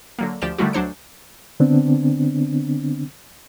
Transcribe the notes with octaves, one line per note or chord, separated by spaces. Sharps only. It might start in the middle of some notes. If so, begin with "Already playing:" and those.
D3 F#3 A#3
D2 F3 G4 D5 E7
D3 D#3 G3 A3 E4 F#4
D2 F#3 D4 C5 C#7
D3 B3 C4 D4